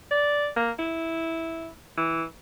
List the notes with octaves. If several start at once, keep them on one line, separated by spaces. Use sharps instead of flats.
D5
A#3
E4
E3